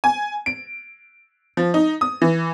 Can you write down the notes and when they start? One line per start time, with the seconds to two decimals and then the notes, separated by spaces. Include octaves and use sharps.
0.04 G#5
0.46 D7
1.57 F3
1.74 D#4
2.01 D#6
2.22 E3